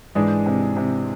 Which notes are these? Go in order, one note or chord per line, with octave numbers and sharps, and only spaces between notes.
G#2 E3 G#3 D4 G#4
C3
C3